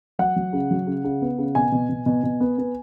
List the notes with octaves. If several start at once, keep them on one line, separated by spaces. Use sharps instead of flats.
F#3 F#5
F#3
C#3
F#3
C#3
C#3
B3
C#3
B2 G#5
B2
B2
B2
B2
B3
B3